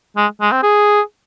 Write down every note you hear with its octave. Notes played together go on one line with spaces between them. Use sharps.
G#3
G#3
C4
G#4